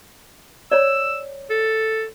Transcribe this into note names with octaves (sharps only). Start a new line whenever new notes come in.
C#5 D5 E6
A4